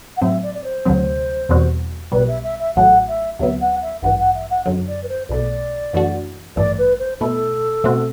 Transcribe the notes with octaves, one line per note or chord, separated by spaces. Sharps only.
F#5
A2 F#3 C4 E5
D5
D5
C5
D2 C3 F#3 C4
E2 B2 G3 C4 F#4
B1 B2 G3 B4
E5
E5
E5
A1 A2 F#3 A3 F#5
E5
D2 C3 F#3 B3 E5
F#5
E5
A1 G2 E3 F#5
F#5
E5
F#5
F#2 D3 F#3
D5
B4
C5
B1 B2 A3 D5
F#2 E3 A3 D4 F#4
A1 G2 E3 A3 D5
B4
C5
B2 A3 E4 A4
B2 A3 C4 F#4